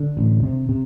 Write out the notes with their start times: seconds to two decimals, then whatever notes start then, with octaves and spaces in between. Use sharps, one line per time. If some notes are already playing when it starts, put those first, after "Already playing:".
Already playing: D3
0.17 A1
0.43 C3
0.69 C3